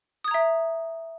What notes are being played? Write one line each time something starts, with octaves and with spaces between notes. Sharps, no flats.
E5 A#5 D#6 G#6